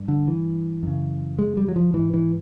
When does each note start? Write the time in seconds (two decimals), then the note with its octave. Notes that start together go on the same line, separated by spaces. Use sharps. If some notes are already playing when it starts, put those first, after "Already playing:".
Already playing: G2
0.08 D3
0.28 E3
0.83 F#2 C#3
1.39 G#3
1.57 G3
1.68 F#3
1.76 F3
1.94 G#2 E3
2.14 E3